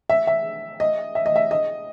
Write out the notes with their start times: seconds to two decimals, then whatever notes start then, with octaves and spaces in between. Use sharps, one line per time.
0.09 E5
0.27 E5
0.80 D#5
1.15 E5
1.26 D#5
1.36 E5
1.51 D#5